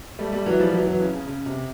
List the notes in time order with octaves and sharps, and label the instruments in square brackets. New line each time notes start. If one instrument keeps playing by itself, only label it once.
[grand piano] G3 A3
G3 A3
E3 F#3
F3 G3
E3 F#3
E3 F#3
C#3
C#3
C#3
C3